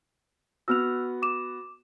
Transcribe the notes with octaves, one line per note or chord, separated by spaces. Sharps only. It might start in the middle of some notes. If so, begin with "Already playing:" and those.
B3 F#4 E6 F6 F7
D6 E7